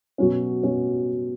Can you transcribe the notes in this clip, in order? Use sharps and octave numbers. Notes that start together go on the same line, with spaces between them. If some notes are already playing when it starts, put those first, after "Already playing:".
B2 F#3 C#4
B2 F#3 C#4